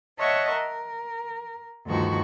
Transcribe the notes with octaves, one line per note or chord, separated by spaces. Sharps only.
C#5 D#5 E5 F#5 A5 C#6
A#4
D2 G2 D#3 F3 F#4 C#6